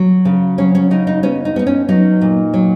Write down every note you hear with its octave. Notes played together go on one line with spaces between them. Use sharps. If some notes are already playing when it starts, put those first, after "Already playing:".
Already playing: F#3
C#3
F#3 C#4
C#4
C#3 D#4
D#4
B3 C#4
D#4
B3 D#4
C#4
F#3 D#4
A#2
F#3